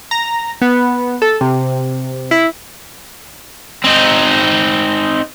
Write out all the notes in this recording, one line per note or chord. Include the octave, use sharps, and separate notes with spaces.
A#5
B3
A4
C3
E4
C4 D#4